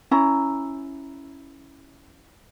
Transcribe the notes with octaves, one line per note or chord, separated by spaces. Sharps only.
C#4 E4 A#5